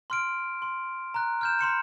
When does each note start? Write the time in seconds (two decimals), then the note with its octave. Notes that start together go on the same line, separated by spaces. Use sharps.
0.10 C6 F6 D7
0.62 C6
1.14 A#5 F#6
1.41 F6 G6 E7
1.59 B5 C6 C#7 E7